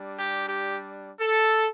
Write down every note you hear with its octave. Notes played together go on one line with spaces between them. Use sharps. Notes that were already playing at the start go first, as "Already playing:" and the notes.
Already playing: G3 D4
G4
G4
A4